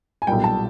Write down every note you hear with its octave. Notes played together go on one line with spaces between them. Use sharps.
G#5
B1 A#2 G3 G5
A5